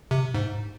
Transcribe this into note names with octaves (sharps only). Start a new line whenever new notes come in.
C3
G#2